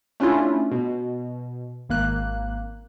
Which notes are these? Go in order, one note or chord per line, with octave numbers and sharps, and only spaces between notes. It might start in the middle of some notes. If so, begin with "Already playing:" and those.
A3 C#4 D4 E4 F4
B2
G#1 A#3 F#6